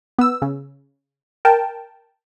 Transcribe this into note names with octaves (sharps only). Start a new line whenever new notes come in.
B3 E6
C#3
A#4 G5 A5